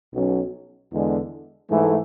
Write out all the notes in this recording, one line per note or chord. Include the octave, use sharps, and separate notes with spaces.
B1 B2 F#3 C#4
E2 D3 G#3
G#2 E3 A3